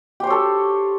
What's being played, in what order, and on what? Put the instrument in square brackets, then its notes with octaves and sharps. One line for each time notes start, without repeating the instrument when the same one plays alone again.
[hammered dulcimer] G4
C5
C#5
A4